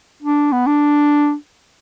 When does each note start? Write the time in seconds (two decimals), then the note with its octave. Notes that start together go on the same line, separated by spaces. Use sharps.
0.23 D4
0.52 B3
0.67 D4